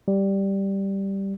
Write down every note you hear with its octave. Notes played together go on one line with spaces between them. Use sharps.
G3